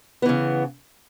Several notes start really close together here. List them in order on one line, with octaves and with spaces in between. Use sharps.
B3 E3 C#3